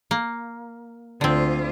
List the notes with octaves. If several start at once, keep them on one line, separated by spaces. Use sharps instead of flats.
A#3
D2 D3 C4 F4